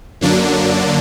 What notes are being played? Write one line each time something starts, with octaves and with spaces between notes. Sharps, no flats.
F#2 D3 F#3 A#3 D4